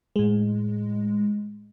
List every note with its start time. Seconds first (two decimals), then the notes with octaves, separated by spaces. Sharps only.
0.16 A2 G#3